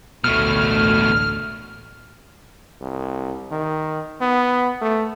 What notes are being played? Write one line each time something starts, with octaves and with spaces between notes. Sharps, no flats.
A1 D2 B2 A3 F6
C2
D#3
B3
A3